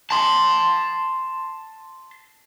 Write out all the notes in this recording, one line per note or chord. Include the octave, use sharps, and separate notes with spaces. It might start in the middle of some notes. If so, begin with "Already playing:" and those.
A5 C6